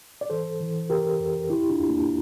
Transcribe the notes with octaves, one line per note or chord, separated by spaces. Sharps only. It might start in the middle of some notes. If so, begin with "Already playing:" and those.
D5
E3 A4 C5
E3
C3 G4 A#4
F2
C3 E4 G4
D4 F4
E2
A#3 D4